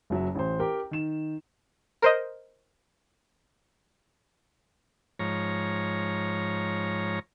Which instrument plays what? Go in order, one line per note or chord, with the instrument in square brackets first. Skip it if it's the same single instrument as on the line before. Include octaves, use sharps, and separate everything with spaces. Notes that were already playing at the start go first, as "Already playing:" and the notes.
[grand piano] F#1 F#3 E5
A1 C5
G4 A#4 G5
D#3 E7
[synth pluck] A#4 C5 D#5
[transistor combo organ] G#2 F3 C#5 A#5